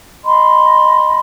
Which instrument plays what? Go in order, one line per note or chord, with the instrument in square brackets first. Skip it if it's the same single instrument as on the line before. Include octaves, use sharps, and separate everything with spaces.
[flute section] D#5 B5 C6